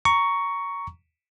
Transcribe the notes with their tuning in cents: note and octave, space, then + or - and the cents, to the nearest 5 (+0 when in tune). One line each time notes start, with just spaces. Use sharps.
A#5 +0 C#6 +10